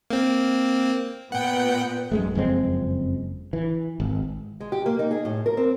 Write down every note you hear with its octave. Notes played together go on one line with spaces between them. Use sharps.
A#3 C4
A#2 B3 F#5 G5
F#2 G#3 A3
F#1 F2 G#3 C4
E3
G#1
G#3
G4
A#3
D#4
G#4
A2
A#4
C4